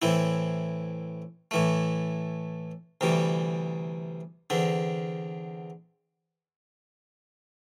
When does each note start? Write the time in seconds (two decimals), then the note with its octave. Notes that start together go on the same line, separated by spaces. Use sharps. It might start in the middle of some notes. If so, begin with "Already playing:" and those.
0.02 A2 E3 C4 E4
1.51 A2 E3 A3
3.01 D2 C3 E3 G3
4.50 E2 D3 C4